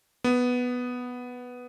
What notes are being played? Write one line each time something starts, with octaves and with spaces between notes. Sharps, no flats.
B3